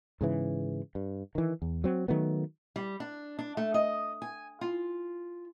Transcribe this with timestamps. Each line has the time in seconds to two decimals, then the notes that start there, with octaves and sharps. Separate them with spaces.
0.21 G#2 C#3 E3
0.95 G2
1.35 D#3 E3
1.62 E2
1.84 F#3 C4
2.08 D#3 F#3 A3 B3
2.76 G3
3.00 D4
3.39 D4
3.57 A3
3.74 D#5
4.22 G#5
4.61 F4